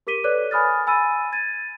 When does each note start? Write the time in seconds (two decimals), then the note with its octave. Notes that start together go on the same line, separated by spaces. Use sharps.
0.07 G4 A#4 D6 B6 D#7 G7
0.24 A4 B4 C#5 D5 D6 F#6
0.51 G#5 B5 D#6 F6 A6
0.87 G#5 B5 E6 A6 D#7
1.32 G#6 A6 D#7